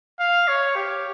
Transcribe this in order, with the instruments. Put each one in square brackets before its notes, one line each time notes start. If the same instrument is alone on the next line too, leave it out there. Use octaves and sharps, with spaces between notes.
[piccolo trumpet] F5
C#5
G4